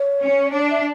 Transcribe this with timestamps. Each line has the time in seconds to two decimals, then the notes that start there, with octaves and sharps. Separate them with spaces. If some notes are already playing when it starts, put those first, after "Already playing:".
Already playing: C#5
0.22 C#4
0.52 D4 C#5
0.61 D5
0.70 E5